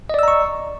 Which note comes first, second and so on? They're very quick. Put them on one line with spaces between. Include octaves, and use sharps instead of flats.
D#5 D5 E6 A#5 C#6